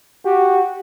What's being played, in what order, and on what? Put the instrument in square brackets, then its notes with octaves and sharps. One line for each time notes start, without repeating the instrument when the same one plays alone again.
[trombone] F#4 [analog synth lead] G4